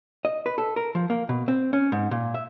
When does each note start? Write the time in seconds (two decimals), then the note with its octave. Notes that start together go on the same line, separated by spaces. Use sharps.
0.25 D#5
0.46 B4
0.58 A4
0.76 A#4
0.95 F3
1.10 A#3
1.29 B2
1.48 C4
1.73 C#4
1.92 G#2
2.11 A#2
2.34 E5